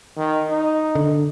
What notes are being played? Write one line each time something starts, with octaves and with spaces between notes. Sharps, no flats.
D#3
D#4
D3